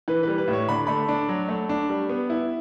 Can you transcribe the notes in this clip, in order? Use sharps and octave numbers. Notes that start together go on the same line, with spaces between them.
E3 B4
G3 B4
B4
A2
C#5
D3 B5
A3 B5
D4
F#3
A3
D4
G3
B3
E4